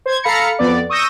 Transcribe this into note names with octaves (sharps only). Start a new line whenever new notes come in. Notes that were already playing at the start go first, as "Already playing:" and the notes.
C5 G#6
A4 F5 A#5 B5 A#6 C#7
F2 B3 D5
C#6 D#6 E6 G6 A#6